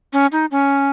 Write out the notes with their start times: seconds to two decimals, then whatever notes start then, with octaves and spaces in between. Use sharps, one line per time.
0.13 C#4
0.32 D#4
0.51 C#4